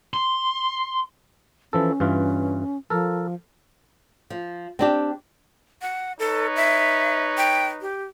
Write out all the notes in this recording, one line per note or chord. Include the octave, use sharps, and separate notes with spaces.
C6
E3 F3 C#4 A4
G2 E3 F4
F3 A4 A#4
F3
C4 D4 G4
F#5
D#4 A4 B4 C#5
E5
G5
G4